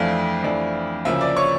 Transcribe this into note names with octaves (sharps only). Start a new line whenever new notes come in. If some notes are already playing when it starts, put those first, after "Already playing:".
Already playing: F2 E3 A3 D4 F5
F2 E3 A3 D4
D2 C#3 F3 A#3 E5 E6
D5 D6
C#5 C#6